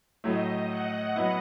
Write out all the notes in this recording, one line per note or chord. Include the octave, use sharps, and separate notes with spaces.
A2 F#3 A3 D#5
F#5
F#3 B3 E4